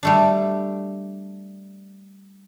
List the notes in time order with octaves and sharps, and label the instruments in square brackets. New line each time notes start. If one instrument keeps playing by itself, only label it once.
[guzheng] G3 A3 D4